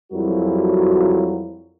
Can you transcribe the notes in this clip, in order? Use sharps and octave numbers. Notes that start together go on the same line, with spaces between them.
F2 F#3 G3 E4 F#4 A#4